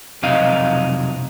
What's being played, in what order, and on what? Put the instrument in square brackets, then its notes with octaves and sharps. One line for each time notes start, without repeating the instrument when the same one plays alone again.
[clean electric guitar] B1 F2 C3 F#3 D#4 F5